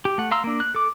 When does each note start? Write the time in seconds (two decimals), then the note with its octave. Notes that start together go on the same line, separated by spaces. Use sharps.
0.05 G4
0.18 A3 F#5
0.31 F5 A#5 C6 E6
0.44 A#3 D4
0.60 F#6
0.75 A4 D6